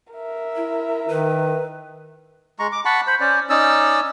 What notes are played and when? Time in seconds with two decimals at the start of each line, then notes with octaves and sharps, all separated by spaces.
0.13 A#4 E5
0.56 E4
1.08 D#3 B4
2.59 G#3 A#5 C#6
2.72 D6
2.85 F#5 A5 B5 C#6
3.07 C5 B5
3.20 C#4 C5 D5
3.50 C#4 D#4 D5 E6